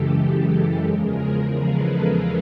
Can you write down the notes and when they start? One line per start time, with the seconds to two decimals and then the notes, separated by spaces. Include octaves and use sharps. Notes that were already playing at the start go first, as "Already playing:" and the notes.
Already playing: F#2 C#3 E3 G#3 G4 A4
0.86 E2 C#3 F3 G#3 G#4 A#4
1.57 A4 B4